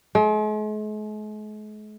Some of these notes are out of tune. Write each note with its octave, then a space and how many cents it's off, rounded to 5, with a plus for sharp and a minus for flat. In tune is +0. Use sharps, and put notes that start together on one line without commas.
G#3 +45